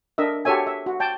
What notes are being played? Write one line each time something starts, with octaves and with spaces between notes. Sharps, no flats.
D4 A#4 D#5 E5
F#4 G4 A4 C#5 E5 G#5
E5
F#4
G5 A5